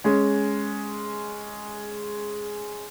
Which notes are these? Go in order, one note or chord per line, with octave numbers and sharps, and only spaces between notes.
G#3 C#4